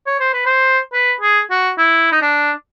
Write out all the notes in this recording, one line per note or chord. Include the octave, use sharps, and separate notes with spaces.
C#5
C5
B4
C5
B4
G#4
F#4
E4
D#4
D4